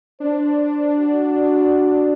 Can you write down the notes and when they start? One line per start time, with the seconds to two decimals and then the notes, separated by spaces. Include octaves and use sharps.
0.20 D4 C5
0.99 F#4